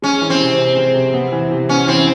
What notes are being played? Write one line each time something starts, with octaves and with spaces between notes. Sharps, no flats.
G#3 C#4
E3
C4
C3
C3
G#3
C3
B3
E3
C3
B3 C#4
E3 C4